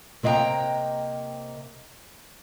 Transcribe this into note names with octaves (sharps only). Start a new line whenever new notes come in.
C3 A#3 D#5 F5 G5 A#5